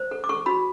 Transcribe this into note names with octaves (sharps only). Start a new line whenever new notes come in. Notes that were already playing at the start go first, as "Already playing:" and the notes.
Already playing: C5
A4
D6
A4 C#6
F#4 B5